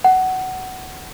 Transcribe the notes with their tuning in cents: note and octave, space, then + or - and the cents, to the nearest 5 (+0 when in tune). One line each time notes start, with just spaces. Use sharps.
F#5 +15